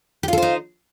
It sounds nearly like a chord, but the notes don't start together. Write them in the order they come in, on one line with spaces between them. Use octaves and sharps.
G4 F4 A4 C5 D#4